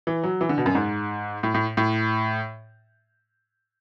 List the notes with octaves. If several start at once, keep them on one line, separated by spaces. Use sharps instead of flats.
E3
F#3
E3
D3
B2
F#2
G#2
A2
A2
A2